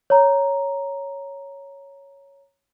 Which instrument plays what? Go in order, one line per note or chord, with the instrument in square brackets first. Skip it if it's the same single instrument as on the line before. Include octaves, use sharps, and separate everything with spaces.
[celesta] C#5 A#5